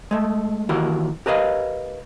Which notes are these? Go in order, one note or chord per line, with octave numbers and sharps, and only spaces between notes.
G#3 A3
D#3 E3 A#3 F#4 G4 A#4
G4 A#4 B4 D#5 F5